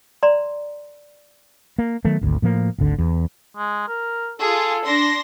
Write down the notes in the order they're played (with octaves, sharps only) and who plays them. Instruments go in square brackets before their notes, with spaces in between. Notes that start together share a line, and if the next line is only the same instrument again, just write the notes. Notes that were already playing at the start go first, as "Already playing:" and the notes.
[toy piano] D5 A#5 C6
[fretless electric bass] A#3
D#3 F#3 A3 B3
G#1 D2
A2 F3 A#3
G#1 D2 D3
E2
[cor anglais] G#3
A#4
[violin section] F4 G#4 [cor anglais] A4
[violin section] D4 C6 A#6